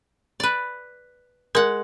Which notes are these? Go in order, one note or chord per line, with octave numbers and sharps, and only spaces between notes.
B4 D5
G#3 A#4 F#5